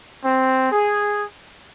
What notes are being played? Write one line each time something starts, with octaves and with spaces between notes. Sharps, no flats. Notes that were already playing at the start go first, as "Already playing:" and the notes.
C4
G#4